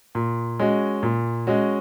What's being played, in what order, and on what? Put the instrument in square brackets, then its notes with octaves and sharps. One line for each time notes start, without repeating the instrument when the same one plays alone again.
[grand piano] A#2
G#3 C#4 F#4
A#2
G#3 C#4 F#4